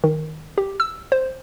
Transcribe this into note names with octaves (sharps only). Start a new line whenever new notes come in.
D#3
G4
E6
C5